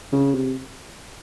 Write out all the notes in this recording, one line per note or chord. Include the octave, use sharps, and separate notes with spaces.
C#3
C3